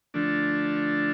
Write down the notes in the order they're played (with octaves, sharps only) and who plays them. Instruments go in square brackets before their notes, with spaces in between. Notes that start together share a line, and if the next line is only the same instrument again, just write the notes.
[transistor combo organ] D3 F3 A3 D4